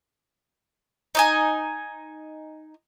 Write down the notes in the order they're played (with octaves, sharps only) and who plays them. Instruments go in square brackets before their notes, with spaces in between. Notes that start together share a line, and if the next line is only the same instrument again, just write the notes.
[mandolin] D#4 D#5 G#5